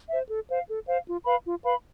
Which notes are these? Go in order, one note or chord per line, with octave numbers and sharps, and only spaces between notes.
C5 E5
A4
C5 F5
A4
C5 F5
F4
B4 F5 B5
F4
B4 F5 B5